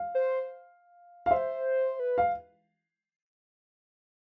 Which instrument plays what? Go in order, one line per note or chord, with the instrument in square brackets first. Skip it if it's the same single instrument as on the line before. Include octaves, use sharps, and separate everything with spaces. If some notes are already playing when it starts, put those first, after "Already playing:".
Already playing: [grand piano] F5
[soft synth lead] C5
[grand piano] F5
[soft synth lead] C5 [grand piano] E5
[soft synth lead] B4
[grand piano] F5